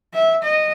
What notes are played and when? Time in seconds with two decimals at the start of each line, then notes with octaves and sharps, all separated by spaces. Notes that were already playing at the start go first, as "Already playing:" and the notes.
0.14 E5
0.43 D#5